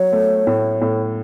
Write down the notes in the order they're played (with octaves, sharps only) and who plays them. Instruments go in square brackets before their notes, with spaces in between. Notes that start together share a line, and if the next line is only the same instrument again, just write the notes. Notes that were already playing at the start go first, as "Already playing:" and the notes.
Already playing: [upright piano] F#3 [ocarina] C#5
[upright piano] A3
A2
A2